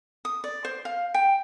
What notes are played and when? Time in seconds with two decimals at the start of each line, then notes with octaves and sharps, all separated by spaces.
0.25 D#6
0.44 D5
0.65 C5
0.85 F5
1.14 G5